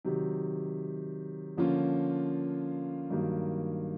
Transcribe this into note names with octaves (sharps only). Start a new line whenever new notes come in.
C3 D#3 F#3
D3 F3 A#3 C#4 F4
G2 D#3 F#3 A#3